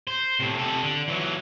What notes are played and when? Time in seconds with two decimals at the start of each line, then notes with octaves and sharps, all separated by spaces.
0.07 C5
0.40 A2 C3
0.58 C3 A4
0.83 D3
1.08 E3 F#3